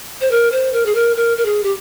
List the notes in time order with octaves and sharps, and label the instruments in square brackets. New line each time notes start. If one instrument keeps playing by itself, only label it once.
[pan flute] C5
A#4
C5
A#4
G#4
A#4
A#4
A#4
G#4
G4